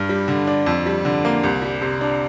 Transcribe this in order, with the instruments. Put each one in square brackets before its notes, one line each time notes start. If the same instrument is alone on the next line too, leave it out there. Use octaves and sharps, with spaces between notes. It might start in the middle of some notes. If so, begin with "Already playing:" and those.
Already playing: [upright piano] G2
G3
D3
D4
F2
G3
D3
A#3
C2
G3
C3
D4